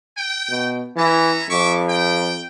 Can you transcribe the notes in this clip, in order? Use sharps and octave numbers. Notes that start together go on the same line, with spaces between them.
G5
B2
E3 C#4 E5 A#5
F2 E5 C#6 D6
G5